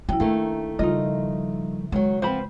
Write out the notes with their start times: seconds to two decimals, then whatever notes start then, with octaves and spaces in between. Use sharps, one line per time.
0.09 F#2 F#3 E4 G5
0.20 D#3 A3 A#3 D4
0.79 C#3 F3 G3 D#4 F4 D#5
1.92 D#3 F3 F#3 G#3
2.22 F3 B3 C4 C5 B5